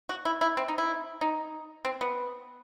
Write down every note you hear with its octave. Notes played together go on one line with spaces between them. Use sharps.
F#4
E4
E4
C4
D#4
E4
D#4
C4
B3